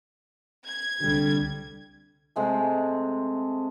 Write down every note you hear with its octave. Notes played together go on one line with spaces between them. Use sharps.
G#6
C2 D3 G3
C3 G#3 A3